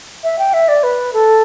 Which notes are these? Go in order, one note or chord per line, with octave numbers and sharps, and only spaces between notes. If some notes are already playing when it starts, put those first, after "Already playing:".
E5
G5
E5
D5
B4
A4